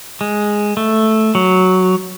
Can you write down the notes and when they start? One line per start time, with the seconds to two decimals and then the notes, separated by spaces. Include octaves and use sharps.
0.21 G#3
0.77 A3
1.35 F#3